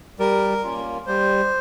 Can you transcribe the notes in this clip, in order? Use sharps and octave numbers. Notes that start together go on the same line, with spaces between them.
G3 A#4
A#3 C#4 F4
G3 C5